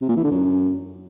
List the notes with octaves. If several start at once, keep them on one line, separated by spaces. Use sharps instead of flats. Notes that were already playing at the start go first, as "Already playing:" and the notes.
C3
A#2
E3
D3
F#2